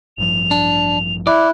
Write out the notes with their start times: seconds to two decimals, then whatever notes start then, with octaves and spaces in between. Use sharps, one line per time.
0.18 A1 G2 F3 F7
0.51 D4
1.27 E4 D5 F#6